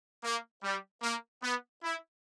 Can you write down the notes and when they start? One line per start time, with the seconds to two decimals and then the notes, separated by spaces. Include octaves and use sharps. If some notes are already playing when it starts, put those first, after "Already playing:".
0.23 A#3
0.63 G3
1.03 A#3
1.43 B3
1.83 E4